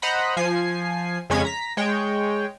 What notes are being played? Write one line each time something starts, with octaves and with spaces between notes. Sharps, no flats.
C5 D#5 F#5 A#5 B5
F3 G#5 C7
F2 C#3 G#3 C#4 G#6 B6
A#5 B6
G#3 C#5 G5